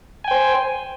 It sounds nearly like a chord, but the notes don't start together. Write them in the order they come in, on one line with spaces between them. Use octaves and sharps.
G#5 G5 C5